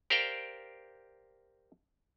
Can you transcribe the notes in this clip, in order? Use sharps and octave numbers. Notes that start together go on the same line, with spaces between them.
G4 A#4 C5 D5 F5 G5